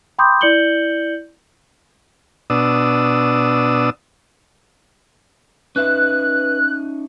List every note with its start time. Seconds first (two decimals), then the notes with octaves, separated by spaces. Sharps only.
0.18 G5 B5 C6 D6 D#6 G6
0.41 E4 D5 G6 C#7 F#7 G7
2.50 B2 D4 D#6 E6
5.76 C#4 D#4 B4 E5 F#6